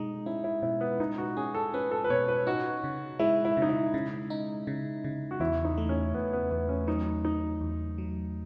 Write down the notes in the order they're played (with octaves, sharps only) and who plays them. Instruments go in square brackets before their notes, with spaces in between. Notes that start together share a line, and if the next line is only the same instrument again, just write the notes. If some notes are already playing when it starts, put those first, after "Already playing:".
Already playing: [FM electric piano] B2 G#3 [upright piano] D#4
[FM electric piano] C#4 [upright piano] E4
[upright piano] E4
[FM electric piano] B2 [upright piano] E4
[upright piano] B3
[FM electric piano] B2 [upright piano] D#4
[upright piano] F#4
[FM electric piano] C#4 [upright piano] G#4
[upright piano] A4
[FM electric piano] C#4 [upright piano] B4
[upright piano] A4
B4
[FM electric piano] B2 [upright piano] C#5
[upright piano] B4
[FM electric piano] D#4 [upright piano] F#4
[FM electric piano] C#3
[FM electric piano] G#3 [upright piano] E4
[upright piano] E4
[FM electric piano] C#3 [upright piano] D#4
[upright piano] E4
[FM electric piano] C#3
D#4
C#3
C#3
[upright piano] F#4
[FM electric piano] E2 [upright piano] E4
[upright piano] D#4
[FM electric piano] A3
[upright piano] C#4
[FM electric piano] E2 [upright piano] B3
[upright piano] B3
[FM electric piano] E2 [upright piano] B3
[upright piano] C#4
[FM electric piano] F#3 [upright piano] D#4
[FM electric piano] A3 [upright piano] D#4
[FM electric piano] E2
F#3